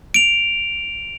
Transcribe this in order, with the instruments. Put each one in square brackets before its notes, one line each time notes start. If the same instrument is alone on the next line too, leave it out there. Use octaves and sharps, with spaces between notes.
[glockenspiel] D7 F7